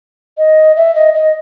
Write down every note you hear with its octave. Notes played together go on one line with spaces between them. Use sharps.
D#5
E5
D#5
D#5